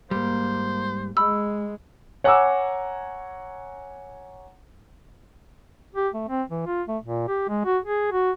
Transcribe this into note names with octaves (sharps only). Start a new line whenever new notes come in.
G#2 G3 A#3 C5
G#3 B5 E6
C#5 F#5 G#5 A#5 D6 E6
G4
A3
C4
E3
F4
A3
A#2
G4
G#3
F#4
G#4
F#4